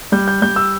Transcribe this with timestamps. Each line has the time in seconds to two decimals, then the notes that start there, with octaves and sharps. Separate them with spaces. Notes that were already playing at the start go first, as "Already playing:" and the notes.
0.12 G3 G6
0.28 G6
0.42 G3 G6
0.56 E6